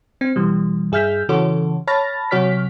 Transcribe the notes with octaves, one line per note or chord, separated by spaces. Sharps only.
C4
B2 E3 G3
G2 G#4 E5 F6 G6 B6
C#3 E3 F#4 A4 C#5
C#5 A5 B5 F6 A6 A#6
C3 F#3 F#4 C#5 F6 B6